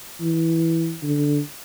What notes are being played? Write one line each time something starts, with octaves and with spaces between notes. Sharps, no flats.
E3
D3